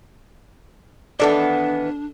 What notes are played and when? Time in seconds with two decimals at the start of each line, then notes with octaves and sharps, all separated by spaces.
1.20 D#3 E3 B3 D4 A4 D5